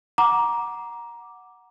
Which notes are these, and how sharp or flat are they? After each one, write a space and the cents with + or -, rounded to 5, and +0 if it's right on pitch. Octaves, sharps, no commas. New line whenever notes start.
F#5 +0 A#5 +15 D6 +0